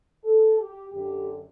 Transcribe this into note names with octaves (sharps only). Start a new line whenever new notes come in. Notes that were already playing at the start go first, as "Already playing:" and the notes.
A4
G4
F#2 D3 G4